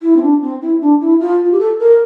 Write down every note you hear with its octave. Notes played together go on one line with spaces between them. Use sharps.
E4
C4
D4
C4
E4
D4
E4
F4
F4
G4
A4
A#4